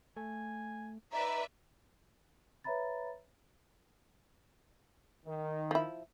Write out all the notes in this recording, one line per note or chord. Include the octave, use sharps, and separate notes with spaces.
A3 G#5
D#4 B4 D5 E5 A#5
B4 C#5 E5 A#5 B5 A6
D#3
F3 E4